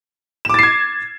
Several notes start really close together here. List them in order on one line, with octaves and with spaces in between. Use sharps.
E7 D6 A6 C7 G#6